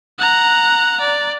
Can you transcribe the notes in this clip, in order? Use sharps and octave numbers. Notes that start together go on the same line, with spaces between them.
F#5 A#5
D5